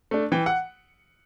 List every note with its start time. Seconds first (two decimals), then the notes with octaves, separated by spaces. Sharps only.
0.11 A3 D4
0.32 E3 G5
0.46 F#5